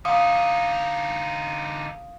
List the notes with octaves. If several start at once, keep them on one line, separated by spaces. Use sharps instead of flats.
D3 D#4 F5 D#6